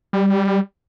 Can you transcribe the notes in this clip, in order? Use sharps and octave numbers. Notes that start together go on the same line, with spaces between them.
G3